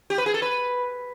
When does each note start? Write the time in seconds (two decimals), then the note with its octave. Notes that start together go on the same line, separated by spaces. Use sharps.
0.10 G4
0.18 B4
0.26 G#4
0.34 A4
0.42 B4